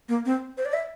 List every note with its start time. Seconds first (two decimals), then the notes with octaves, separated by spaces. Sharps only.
0.08 A#3
0.25 C4
0.57 C5
0.65 D5
0.73 E5